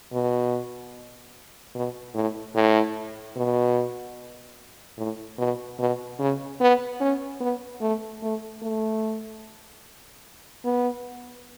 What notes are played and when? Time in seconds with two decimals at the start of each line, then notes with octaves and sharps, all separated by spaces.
0.13 B2
1.75 B2
2.15 A2
2.55 A2
3.37 B2
4.98 A2
5.39 B2
5.79 B2
6.20 C#3
6.61 B3
7.00 C#4
7.40 B3
7.81 A3
8.23 A3
8.62 A3
10.65 B3